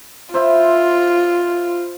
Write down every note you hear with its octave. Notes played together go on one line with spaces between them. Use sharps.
F4 C5 E5 B5